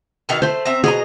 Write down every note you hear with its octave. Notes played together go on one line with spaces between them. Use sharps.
B2 D#3 E4
A3 C5 C6
C4 E5 A#5
B2 G#4 D#5 A#5